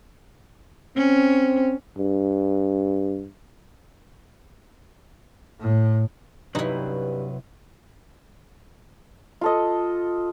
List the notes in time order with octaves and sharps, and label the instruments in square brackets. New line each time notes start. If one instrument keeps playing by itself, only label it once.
[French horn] C4 [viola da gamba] C#4
[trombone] G2
[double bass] A2
[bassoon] G2 [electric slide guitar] C3 F#3 B4 [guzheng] D#4 E4
[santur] F4 A4 D#5